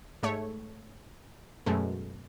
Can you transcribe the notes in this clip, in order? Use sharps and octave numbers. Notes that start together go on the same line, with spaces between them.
G#2 A3 C#5
F#2 B2 G#3 A3